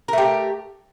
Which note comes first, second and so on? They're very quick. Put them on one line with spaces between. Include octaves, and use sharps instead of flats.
A#4 A3 G4